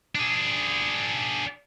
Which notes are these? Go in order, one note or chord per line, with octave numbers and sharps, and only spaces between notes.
D4 G#4